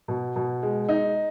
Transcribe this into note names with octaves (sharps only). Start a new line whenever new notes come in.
B2
B2
G#3
D#4